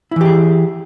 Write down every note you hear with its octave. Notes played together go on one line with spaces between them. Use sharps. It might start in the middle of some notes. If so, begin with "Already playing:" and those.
E3 E4 G4 G#4